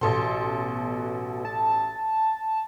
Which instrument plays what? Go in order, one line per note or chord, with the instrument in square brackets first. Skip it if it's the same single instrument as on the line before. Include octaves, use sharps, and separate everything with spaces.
[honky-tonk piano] A1 A4 C6 [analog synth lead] B2
[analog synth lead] A5